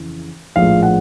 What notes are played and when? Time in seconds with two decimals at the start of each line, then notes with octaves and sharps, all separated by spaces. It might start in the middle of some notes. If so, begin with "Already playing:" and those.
Already playing: F2 C#3 E3
0.56 A#1 A2 F3 G#3 F5
0.83 F#5